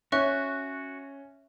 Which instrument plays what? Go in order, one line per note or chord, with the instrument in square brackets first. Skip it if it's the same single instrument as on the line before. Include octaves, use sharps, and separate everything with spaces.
[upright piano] C#4 [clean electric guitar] F#4 [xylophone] E5 C#6 F#6